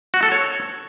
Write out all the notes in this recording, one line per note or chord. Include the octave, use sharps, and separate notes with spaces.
F#4
A4
C#5